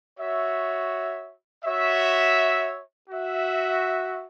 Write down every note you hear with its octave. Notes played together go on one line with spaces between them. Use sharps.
F#4 C#5 E5
F#4 C#5 E5
F#4 E5